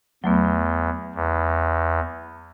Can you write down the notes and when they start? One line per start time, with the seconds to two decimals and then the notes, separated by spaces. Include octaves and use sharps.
0.24 E2 F#3 A3 B3
1.15 E2